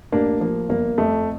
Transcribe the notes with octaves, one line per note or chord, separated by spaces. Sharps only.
A1 A#3 D4
F3 A#3
G1 A#3
F2 A3